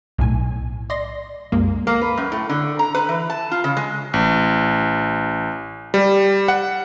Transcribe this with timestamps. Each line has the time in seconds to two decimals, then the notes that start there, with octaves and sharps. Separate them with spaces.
0.18 B1 A2 G#5
0.90 D5 D#5 C6 A#6
1.52 C2 F#2 G#3 A#3
1.87 A#3
2.01 B4
2.17 F#2
2.32 A2
2.49 D3
2.79 A#5
2.95 B4
3.09 E3
3.30 A5
3.51 F4
3.64 C#3
3.77 G#3
4.14 A1
5.94 G3
6.48 F#5